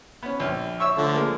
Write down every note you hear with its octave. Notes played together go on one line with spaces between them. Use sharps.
B3 C#4
A#1
C#5 E5 C#6 E6
D3 F3 A3
G#3 A#3